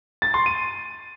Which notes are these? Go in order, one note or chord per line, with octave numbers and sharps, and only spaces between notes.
A6
C6
D#7